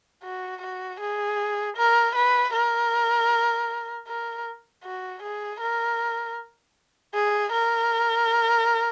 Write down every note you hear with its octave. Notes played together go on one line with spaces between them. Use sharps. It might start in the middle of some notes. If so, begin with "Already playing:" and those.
F#4
F#4
G#4
A#4
B4
A#4
A#4
F#4
G#4
A#4
G#4
A#4